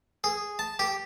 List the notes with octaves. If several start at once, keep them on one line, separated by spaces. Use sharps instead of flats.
G#4
A5
G4